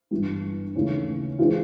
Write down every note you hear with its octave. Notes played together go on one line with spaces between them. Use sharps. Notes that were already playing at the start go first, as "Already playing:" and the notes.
G1 G2 E3 G3
D#2 C#3 E3 A3 C#4
E3 G#3 C4 F4 G#4